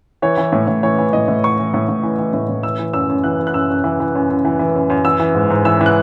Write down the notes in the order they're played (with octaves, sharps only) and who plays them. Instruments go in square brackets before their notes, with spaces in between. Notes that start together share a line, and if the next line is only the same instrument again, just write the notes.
[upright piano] E3 C#5
E3
A2
A2
E3 C#5
E3
A2 D#5
A2
E3 C#6
E3
A2
A2
E3
E3
A2
A2
E3 E6
E3
F#2 E6
F#2
E3 F#6
E3
F#6
F#2 E6
F#2
E3
E3
F#2
F#2
E3
E3
F#2
F#2
E3 E6
E3
G#2
G#2
E3 E6
E3
F#6